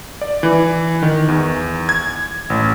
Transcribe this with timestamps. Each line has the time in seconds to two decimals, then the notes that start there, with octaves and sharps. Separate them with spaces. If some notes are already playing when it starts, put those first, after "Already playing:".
0.22 D5
0.43 E3
1.02 D#3
1.28 E2
1.89 G#6
2.50 A1